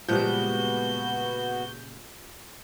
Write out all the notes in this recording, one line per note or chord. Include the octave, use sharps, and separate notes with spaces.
A#2 C#3 F3 G3 G#3 B3 F#4 G6